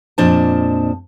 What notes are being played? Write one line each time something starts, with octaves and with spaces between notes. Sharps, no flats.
F2 A#2 D4 C5 D#5 A5